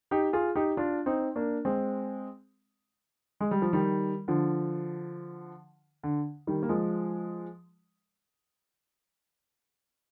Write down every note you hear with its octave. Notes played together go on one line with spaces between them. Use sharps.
D#4 G4
F4 G#4
D#4 G4
D4 F4
C4 D#4
A#3 D4
G#3 C4
G#3
G3
F3
D#3 G3
D3 F3
D3
D#3 G3
A#3
F3 G#3